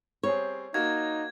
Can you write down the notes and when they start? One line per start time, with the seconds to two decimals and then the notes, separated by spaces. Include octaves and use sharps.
0.23 G3 C4 G#4 C#5
0.74 A#3 D#4 F#4 G#6